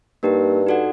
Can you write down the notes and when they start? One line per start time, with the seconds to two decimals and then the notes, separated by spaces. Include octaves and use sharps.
0.23 G2 A#3 D#4 G4 A#4
0.67 D#4 F#4 A4 D5 F#5